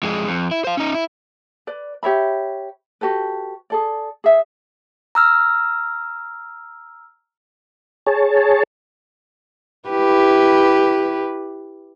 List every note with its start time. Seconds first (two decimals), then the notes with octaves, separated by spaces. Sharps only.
0.03 F2 G#3
0.28 F2
0.51 E4
0.64 C5 F5
0.77 C#4 D#4
0.94 E4
1.67 B4 D5
2.03 G4 C#5 E5 B5
3.01 F#4 G4 A4 B4
3.70 G#4 A4 D5
4.24 G#4 E5
5.15 A#5 E6 F6
8.07 G#4 C#5 A5
9.89 E4 G4 B4